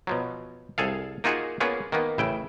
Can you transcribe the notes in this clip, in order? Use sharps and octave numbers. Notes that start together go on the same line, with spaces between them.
B2 F3 F#3
C2 G#4 A4 F5
A#3 D#4 F4 F#4 G#4
A#3 B3 C#4 F4 G#4
D#3 A#3 B3
A1 C#3 E4 G5